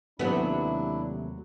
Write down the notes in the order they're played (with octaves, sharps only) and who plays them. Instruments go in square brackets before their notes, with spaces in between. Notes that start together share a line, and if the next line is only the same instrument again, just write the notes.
[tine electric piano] D#2 C3 A3 [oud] F#3 B3 [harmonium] D4 E4